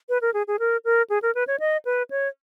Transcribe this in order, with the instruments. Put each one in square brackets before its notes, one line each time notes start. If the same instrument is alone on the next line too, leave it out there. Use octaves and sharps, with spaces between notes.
[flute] B4
A#4
G#4
G#4
A#4
A#4
G#4
A#4
B4
C#5
D#5
B4
C#5